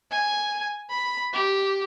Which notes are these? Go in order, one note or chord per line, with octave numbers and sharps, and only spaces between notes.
G#5
B5
G4